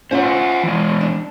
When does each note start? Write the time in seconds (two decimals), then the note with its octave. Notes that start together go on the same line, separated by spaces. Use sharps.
0.11 C#4 F4 C5 F#5
0.24 C5 E5 F#5
0.63 E3 G#3
1.01 D4